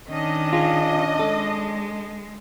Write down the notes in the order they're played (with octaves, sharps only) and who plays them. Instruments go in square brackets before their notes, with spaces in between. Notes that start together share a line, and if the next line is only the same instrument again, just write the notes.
[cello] D#3 [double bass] C#4 D4 [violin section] D#5
[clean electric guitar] F4 G#4
[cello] G#3 [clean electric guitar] A4